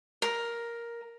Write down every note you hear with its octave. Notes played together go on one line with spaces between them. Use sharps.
A#4